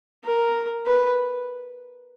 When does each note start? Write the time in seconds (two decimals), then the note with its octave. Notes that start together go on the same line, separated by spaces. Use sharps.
0.24 A#4
0.86 B4